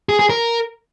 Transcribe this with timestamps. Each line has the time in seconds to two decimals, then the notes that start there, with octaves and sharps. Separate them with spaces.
0.09 G#4
0.19 G#4
0.30 A#4